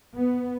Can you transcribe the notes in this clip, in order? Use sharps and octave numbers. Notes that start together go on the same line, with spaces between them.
B3